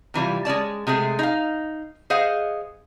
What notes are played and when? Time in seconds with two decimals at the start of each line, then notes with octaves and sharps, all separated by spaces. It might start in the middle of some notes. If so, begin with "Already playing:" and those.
0.14 C3 E3 G3 F4
0.45 G#3 C#4 D5 A5
0.87 C3 G#3 A3 G#4
1.19 D#4 F5
2.10 G#4 C5 D#5 F5 F#5